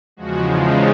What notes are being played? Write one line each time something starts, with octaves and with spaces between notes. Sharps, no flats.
E2 C#3 F3 G#3 F#4
D#4